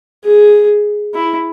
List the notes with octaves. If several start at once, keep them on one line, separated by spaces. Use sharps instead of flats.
G#4
E4